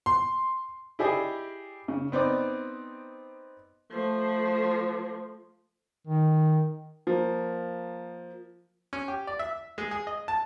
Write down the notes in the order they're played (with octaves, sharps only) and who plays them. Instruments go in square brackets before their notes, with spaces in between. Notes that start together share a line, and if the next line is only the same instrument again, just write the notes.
[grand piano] C6
[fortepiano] E4 G4 G#4 D5 D#5
C#3
B3 C4 D#4 D5
[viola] F3 A3
[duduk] D#3
[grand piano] F3 A#3
[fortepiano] C#4
G4
D5
E5
G#3
G#4
D#5
A5